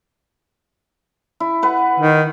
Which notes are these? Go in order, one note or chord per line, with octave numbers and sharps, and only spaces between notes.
E4
B4 F#5
D#3